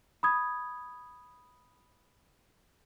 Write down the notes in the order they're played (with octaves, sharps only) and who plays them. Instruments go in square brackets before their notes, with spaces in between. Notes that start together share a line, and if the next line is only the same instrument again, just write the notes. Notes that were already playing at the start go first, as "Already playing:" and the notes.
[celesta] B5 D#6 G#6